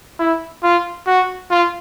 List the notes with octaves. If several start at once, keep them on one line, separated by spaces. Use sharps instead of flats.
E4
F4
F#4
F4